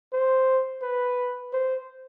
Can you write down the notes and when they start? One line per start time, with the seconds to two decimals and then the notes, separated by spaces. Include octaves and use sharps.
0.13 C5
0.82 B4
1.53 C5